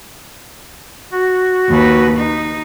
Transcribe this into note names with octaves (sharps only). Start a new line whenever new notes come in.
F#4
D#2 B4
D#4